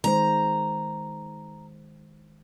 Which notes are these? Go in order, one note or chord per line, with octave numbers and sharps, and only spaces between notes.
D#3 G#3 C5 A#5